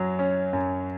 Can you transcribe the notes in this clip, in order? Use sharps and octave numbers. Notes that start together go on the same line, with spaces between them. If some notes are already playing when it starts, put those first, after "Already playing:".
Already playing: F#2 F#3
C#4
F#2